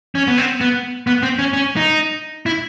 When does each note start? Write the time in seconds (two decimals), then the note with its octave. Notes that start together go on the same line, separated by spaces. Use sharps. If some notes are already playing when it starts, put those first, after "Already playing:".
0.15 C#4
0.28 B3
0.38 C4
0.61 B3
1.07 B3
1.23 C4
1.39 C#4
1.53 C#4
1.77 D#4
2.46 E4